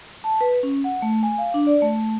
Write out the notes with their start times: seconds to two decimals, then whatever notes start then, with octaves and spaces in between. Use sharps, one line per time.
0.24 A5
0.41 B4
0.63 C#4
0.84 F#5
1.02 A3
1.23 G#5
1.38 F5
1.54 D4
1.67 D5
1.82 A3